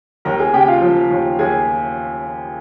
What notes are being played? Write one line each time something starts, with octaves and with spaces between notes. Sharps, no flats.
D#2 A#4 A#5
G#4 G#5
C#3 G4 G5
F4 F5
F3
D#2
D#2 G#4 G#5